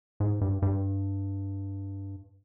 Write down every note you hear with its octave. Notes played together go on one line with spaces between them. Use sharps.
G#2
G2
G2